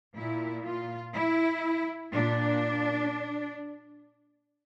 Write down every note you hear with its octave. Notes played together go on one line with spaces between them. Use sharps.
A#2 E4
F4
E4
A#2 D4